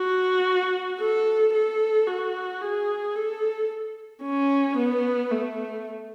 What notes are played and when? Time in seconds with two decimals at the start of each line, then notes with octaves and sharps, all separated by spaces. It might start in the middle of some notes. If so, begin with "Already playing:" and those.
Already playing: F#4
0.99 A4
1.53 A4
2.07 F#4
2.61 G#4
3.15 A4
4.23 C#4
4.77 B3
5.31 A3